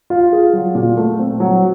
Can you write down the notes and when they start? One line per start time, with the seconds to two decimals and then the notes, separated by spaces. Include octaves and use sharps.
0.10 F4
0.33 G#4
0.53 F#3
0.75 A#2
0.97 A3
1.19 C4
1.40 F#3